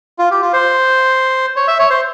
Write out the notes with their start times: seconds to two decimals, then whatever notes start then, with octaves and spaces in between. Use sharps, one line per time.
0.19 F4
0.31 G4
0.42 F4
0.53 C5
1.56 C#5
1.68 E5
1.79 C#5
1.90 C5